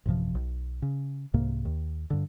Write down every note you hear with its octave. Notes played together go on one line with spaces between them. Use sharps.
A1 F#2 C3 F3
B1
C#3
C2 G#2 C3 A#3
D#2
G2 D3